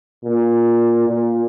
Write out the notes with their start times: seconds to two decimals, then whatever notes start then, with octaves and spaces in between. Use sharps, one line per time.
0.25 A#2
1.08 A#2